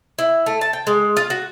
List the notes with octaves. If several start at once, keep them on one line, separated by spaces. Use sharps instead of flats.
E4
A3
A5
G5
G#3
F4
F#4